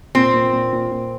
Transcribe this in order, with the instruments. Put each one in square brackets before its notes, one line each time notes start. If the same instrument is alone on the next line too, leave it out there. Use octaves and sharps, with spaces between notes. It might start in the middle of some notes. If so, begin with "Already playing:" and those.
[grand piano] A#2 [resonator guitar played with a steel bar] C4
[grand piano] A#2
A#2
A#2
A#2